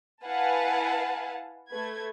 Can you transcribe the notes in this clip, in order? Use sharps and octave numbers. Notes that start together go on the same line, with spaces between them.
E4 B4 F5 F#5 G#5 A5
A3 B4 G#6